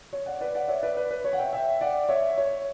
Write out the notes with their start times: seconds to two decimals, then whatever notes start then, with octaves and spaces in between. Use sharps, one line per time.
0.13 C#5
0.26 D5 F#5
0.41 B4 D5
0.55 D5 F#5
0.68 C#5 E5
0.83 B4 D5
0.97 B4
1.11 B4
1.24 C#5
1.33 F#5
1.38 E5 G5
1.53 E5 G5
1.81 D5 F#5
2.09 C#5 E5
2.38 C#5